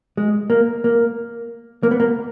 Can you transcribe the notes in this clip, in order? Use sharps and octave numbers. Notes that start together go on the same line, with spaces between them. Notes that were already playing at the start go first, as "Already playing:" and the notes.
G#3
A#3
A#3
A#3
B3
A#3